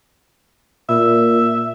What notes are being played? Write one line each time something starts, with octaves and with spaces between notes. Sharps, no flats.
A#2 E5